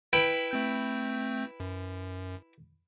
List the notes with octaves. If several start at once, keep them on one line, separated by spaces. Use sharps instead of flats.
E4 B4 G5
A3 C4 G6
F#2